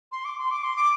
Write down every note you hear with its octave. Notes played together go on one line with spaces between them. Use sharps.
C6
D6
C6
D6
C6
D6